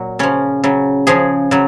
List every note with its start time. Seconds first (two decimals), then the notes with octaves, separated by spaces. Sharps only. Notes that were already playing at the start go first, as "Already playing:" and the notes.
Already playing: A#2 F#3
0.19 C#3 F3 C#4
0.64 C#3 F#3
1.07 C#3 F3 G#4
1.51 C#3 F#3